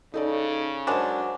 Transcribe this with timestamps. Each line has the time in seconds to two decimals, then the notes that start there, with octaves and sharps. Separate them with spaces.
0.14 C#3 D#4 A4 D5
0.87 F#3 G#3 D4 A#4 C5